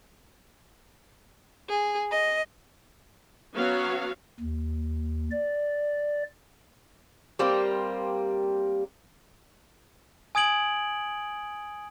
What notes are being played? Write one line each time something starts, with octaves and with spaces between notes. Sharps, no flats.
G#4
D#5
F#3 B3 C#4 F#4 C#5 F5
D#2
D5
G3 A#3 C4
G#5 D#6 G#6 D7 F#7